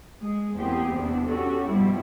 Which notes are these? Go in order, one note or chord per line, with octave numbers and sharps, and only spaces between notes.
G#3 G#4
E2 A#3 C4 G4 G#4
E2 C3 B3 C4 D4
C#4 F#4 G4 A4
G2 B2 F3 G3 E4